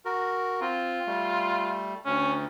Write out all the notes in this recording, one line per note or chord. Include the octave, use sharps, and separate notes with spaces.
F#4 A#4
C4 F4
G3 A3
D2 C#4